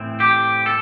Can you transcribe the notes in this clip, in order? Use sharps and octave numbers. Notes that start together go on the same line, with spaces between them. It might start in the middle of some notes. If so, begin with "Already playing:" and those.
Already playing: A2 E3 C4
G4
A4